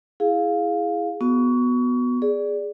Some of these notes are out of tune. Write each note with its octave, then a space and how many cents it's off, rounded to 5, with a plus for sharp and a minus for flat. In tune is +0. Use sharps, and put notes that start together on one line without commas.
E4 +0 G#4 +0 F5 +10
B3 +0 F#4 -5 C#6 +25
G#4 +0 D5 +0